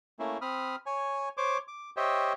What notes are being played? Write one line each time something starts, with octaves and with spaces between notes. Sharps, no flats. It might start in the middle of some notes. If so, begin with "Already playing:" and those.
A3 A#3 C#4 E4
C4 B5 D#6 F6
C#5 G#5
C5 C#5 D6
D6
G4 C5 C#5 D#5 E5 G5